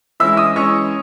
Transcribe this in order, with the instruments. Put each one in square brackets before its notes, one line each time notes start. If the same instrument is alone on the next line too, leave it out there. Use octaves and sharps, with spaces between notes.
[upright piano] E3 G#3 C#4 E4 E5 E6
D#5 D#6
E3 G#3 C#4 C#5 C#6